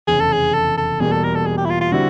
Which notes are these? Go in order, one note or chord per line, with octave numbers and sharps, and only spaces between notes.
F1 E2 C#3 G#4
A4
G#4
A4
A4
E2 B2 G3 A#3 G#4
A4
A#4
A4
G#4
G4
E4
F4
F4
D3 G3 C4 E4 F#4